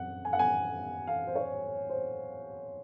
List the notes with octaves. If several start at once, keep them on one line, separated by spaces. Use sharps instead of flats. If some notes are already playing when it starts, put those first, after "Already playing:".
Already playing: F#2 C4 F#5
G#5
F#5
G#5
F5
C5
C#5
C5